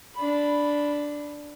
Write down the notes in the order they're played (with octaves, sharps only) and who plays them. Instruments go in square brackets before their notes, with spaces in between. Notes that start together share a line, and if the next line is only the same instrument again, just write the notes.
[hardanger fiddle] D4 B5